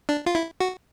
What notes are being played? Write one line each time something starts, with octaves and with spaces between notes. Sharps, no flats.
D4
F4
E4
F#4